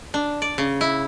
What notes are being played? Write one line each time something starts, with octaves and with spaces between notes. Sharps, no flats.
D4
D5
C#3
E4